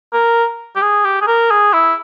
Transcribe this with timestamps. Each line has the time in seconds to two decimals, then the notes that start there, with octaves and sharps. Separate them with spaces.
0.13 A#4
0.76 G4
0.82 G#4
1.05 G4
1.21 G#4
1.27 A#4
1.51 G#4
1.73 E4